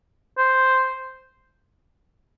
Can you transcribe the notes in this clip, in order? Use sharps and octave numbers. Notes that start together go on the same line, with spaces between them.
C5